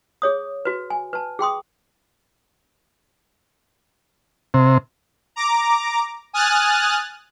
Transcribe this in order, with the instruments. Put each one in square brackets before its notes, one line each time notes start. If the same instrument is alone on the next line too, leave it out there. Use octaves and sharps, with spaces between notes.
[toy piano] G#4 C#5 D#6
F#4 B4
G#5
B4 A5
G#4 G5 C6 D#6
[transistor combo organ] C3
[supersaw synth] A#5 D6
G#5 D#6 F6 F#6 A6